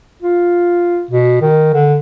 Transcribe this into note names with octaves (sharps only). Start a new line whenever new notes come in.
F4
B2
D#3
D3